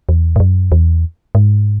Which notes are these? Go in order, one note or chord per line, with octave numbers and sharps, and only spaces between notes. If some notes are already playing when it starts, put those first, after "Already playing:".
E2
G#2
F#2
E2
G#2